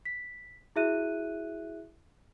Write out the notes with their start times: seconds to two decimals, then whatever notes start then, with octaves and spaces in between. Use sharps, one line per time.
0.05 B6
0.76 E4 F#4 G#4 E5 F#6 D#7